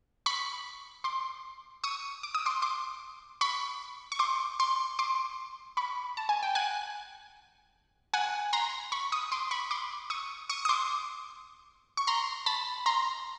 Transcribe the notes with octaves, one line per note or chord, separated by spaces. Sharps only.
B5 C#6
C6 D6
C#6 D#6
D6
D#6
C6 D6
C6 D6
B5 C#6
C#6
C6 D6
C6 D6
C6 D6
B5 C#6
A5
G#5
G5
F#5 G#5
F#5 G#5
A#5 C6
B5 C#6
C#6 D#6
C6 D6
B5 C#6
C6 D6
C#6 D#6
C#6 D#6
D#6
C6 D6
C#6
A#5 C6
A5 B5
A#5 C6